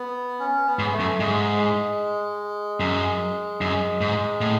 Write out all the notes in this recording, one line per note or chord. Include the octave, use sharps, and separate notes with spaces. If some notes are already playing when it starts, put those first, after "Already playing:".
Already playing: B3
C#4
B3
G#2
A3
F#2
G#2 G#3
F#2
F#2
G#2
A2